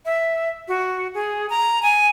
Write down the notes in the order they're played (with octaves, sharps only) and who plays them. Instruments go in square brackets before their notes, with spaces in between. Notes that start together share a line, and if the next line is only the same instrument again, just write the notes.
[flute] E5
F#4
G#4
A#5
G#5